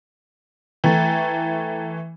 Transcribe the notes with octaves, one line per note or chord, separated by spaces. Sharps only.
E3 A3 G5 A#5 A6